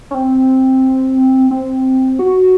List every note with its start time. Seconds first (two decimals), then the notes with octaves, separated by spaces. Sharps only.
0.11 C#4
0.14 C4
1.51 C4
2.19 F#4